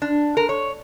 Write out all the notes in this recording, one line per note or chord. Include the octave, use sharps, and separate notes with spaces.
D4
A#4
C#5